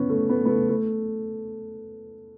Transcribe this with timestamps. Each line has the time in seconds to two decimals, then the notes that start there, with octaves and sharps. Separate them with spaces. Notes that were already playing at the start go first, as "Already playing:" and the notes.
Already playing: B3 C#4
0.10 A3
0.29 B3
0.45 B3
0.49 A3
0.69 A3